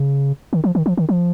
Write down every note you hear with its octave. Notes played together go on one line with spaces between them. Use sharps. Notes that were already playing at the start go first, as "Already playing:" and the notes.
Already playing: C#3
D#3
F3
D#3
F3
D#3
F3